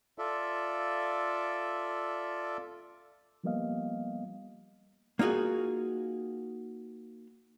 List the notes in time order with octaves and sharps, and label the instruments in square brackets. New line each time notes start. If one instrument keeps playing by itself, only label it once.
[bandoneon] F4 A4 D5 E5
[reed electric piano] F3 G3 A#3 B3 D#5 F5
[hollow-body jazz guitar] A#3 D#4 F4 F#4 G#4